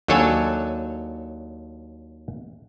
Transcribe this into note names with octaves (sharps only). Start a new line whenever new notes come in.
D#2 F#3 D4 A4 C#5 G#5